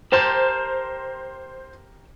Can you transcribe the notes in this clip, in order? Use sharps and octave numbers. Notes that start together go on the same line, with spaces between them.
G4 A#4 C5 A5 G6